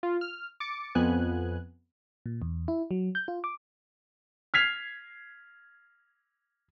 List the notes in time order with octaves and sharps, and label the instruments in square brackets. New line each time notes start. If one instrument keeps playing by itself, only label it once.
[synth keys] F4
F6
D6 A6 C#7
F2 B3 G#5 F#6
[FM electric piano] A#2
E2
E4
F#3
G6
F4
D6
[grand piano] F6 G#6 B6 C7 F7